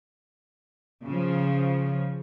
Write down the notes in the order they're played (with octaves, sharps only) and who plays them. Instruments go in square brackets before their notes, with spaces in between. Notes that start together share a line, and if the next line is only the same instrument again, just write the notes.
[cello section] C#3 F3